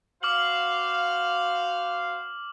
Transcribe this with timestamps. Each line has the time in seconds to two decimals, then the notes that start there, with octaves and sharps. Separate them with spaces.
0.23 F#4 C5 F5 D6 F6 F#7